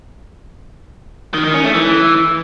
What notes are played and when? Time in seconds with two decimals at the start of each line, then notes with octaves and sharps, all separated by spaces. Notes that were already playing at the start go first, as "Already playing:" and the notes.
1.34 D#3
1.44 D#3
1.54 C#4
1.64 A3
1.74 E3